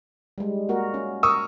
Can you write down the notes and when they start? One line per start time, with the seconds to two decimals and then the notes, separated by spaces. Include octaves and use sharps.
0.38 G3 G#3
0.69 A#3 F#4 A#4
0.94 C#4
1.23 A#4 C#6 D#6 E6